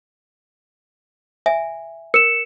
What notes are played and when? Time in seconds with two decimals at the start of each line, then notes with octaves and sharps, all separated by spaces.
1.46 E5 G#5
2.14 A#4 C#7 E7